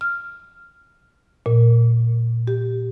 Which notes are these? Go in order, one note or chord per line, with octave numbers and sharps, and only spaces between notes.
F6
A#2
G4